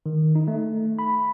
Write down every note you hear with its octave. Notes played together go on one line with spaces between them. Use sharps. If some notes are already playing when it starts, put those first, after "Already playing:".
D#3
D#4
A3
B5